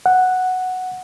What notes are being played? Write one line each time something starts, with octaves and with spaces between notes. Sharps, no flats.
F#5